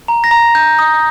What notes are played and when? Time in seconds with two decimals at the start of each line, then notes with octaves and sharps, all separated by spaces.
0.08 A#5
0.24 A#6
0.31 A#5
0.55 G6
0.79 D#6